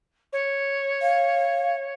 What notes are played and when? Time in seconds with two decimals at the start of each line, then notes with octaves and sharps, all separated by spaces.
0.33 C#5
1.02 F5